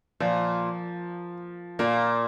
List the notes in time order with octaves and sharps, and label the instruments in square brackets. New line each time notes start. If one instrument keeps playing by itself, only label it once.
[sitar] A#2 [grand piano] F3
[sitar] A#2 [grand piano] A#3